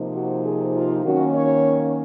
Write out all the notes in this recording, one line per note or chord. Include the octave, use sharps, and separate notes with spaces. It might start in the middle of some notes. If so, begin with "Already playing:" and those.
Already playing: C3 F3 A#3 D#4
F#4
G#4
F4
D#3 F#3 A#3 C#4 F#4
C#5